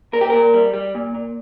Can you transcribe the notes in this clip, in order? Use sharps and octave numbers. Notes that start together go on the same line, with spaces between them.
A#2 A#4
G4
A#2 A#4
G3
G3
A#2
A#2